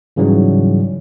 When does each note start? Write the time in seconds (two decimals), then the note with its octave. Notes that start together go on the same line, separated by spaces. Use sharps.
0.16 G#2 C#3 E3 F#3 G3